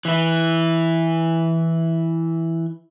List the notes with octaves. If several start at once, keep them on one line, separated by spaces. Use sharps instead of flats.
E3 E4